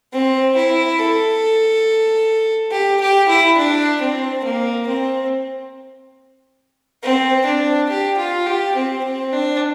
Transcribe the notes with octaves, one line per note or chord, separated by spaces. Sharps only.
C4
E4
A4
G4
G4
E4
D4
C4
A#3
C4
C4
D4
G4
F4
G4
C4
C4
D4